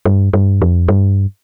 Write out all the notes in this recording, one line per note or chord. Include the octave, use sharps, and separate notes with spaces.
G2
G2
F2
G2